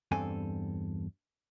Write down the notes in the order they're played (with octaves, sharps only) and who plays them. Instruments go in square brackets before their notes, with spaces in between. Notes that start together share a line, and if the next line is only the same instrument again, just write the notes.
[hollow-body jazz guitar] E2 G2 C4 A4 G#5